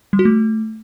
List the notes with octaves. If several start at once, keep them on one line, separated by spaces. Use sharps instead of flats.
G3
F#4
A3